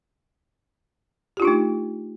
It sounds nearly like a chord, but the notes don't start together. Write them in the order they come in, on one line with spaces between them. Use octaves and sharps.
G4 F4 D4 D#4 A3